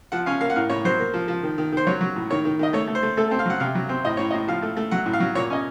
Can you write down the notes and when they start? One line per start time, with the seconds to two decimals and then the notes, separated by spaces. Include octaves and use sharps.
0.12 F3 F#5
0.26 C#4 F5
0.41 A#3 F5
0.50 F#5
0.56 A2 F5
0.70 A2 C#5
0.85 F#3 C5
0.99 A#3
1.14 F3
1.28 F3
1.43 D#3
1.58 D#3
1.72 D#3 C5
1.87 F#3 C#5
2.01 F#3
2.16 A2
2.31 D#3 C#5
2.45 D#3
2.59 D#3 D#5
2.73 A3 C#5
2.87 A3
2.95 C5
3.03 A3
3.17 A3 A4
3.28 A4
3.31 C4
3.39 F5
3.46 F#3 F#5
3.60 C3 F5
3.75 F#3
3.89 C4
4.05 A2 D#5
4.17 A2 C#5
4.31 D#5
4.34 A2
4.48 F3 F5
4.62 A3
4.77 A3
4.91 F#3 F#5
5.06 A2
5.13 F5
5.20 F#3
5.35 A#2 C#5
5.50 C#4 D#5